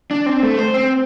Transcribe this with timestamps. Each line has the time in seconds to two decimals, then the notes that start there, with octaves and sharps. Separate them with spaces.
0.11 D4
0.26 C4
0.43 A3
0.59 C5
0.74 C4